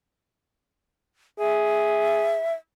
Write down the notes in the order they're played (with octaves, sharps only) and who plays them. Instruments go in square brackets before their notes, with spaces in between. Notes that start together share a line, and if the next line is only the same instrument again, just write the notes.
[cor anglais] G#4 [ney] E5